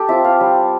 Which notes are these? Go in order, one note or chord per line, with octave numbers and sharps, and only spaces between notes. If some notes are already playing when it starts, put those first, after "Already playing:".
Already playing: G4 A4
C4 F4 E5
F5
G3